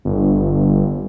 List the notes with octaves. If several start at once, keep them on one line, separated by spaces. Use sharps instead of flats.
G1